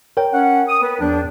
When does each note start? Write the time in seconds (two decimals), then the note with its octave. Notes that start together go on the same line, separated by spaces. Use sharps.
0.17 A#4 C#5 G5
0.32 C#4 F#5
0.67 D#6
0.82 B3 B4
1.00 E2 F3 D4